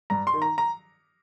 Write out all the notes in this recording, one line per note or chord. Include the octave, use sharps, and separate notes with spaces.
G2 A#5
C6
D#3
A#5
A#5